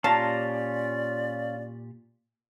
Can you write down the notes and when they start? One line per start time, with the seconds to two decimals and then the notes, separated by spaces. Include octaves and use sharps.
0.04 A#2 C#4 F4 G4 D5 F5 A5 A#5